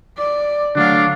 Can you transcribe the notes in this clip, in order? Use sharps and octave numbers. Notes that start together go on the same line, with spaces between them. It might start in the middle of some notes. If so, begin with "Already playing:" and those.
D5
D3 F#3 A3 D4 F5